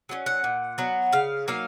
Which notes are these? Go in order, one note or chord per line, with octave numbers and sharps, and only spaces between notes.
F#3 A#3 C#4
F#5
A#2
F#3 B3
C#3 F5
F#3 A#3 D#4 F5